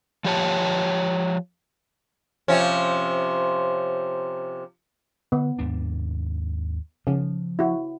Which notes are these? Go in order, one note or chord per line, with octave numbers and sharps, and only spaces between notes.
F3 G4 C#5 A5
C3 F3 C#4
D3 B3
D#2 G#2 D4
C#3 F3
E4 F#4